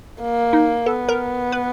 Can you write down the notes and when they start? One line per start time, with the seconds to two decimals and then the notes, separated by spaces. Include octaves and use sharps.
0.21 A#3
0.53 D#4
0.86 B3 A4
1.09 A#4
1.52 B4